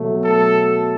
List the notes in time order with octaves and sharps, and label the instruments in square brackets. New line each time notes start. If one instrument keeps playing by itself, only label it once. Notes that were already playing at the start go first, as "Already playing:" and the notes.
Already playing: [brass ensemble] B2 F#3 A3
A4